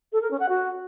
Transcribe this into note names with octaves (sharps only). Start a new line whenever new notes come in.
A4
A#4
C#4
F#5
F#4